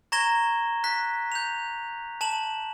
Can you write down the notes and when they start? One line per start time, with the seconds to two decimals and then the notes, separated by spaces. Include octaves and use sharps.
0.12 A#5 C#6 G#6 A#6 E7 G7
0.84 F#6 B6
1.32 G6 F7
2.21 A5 E7 F#7